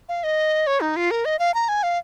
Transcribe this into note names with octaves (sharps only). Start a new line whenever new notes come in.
F5
D#5
C#5
D#4
F4
A#4
D#5
F5
A#5
G#5
F5